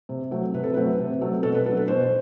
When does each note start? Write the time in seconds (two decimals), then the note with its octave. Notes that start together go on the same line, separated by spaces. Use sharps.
0.09 C3
0.31 F#3 A3 C4
0.54 C3 B4
0.64 A4
0.74 F#3 A3 C4 B4
0.99 C3
1.21 F#3 A3 C4
1.43 B2 A4
1.54 B4
1.66 F#3 B3 D4 A4
1.77 B4
1.88 B2 C5